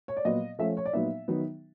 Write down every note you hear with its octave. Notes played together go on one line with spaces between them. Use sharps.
C#5
D5
A#2 F#3 B3 D#5
F3 A3 C#4 E5
C#5
D5
A#2 F#3 B3 D#4 E5
D#3 F#3 B3 D#4